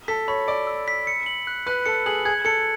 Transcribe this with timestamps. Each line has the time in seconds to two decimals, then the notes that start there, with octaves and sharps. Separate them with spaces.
0.08 A4 B6
0.28 C#5 B5
0.48 D5 D7
0.67 E6
0.88 B6
1.07 C#7
1.26 F#7
1.47 F#6
1.66 B4 F#6
1.86 A4 C#7
2.06 G#4 F#7
2.25 G#4 G#6
2.45 A4 C#7